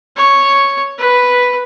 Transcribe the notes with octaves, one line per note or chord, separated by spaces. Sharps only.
C#5
B4